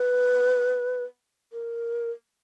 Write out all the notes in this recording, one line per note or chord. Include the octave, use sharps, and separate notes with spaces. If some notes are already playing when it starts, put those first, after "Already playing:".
Already playing: B4
A#4